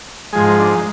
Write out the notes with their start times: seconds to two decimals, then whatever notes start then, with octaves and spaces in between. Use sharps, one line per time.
0.33 G#2 F3 G#3 G#4
0.46 D#4
0.59 D4
0.72 D#4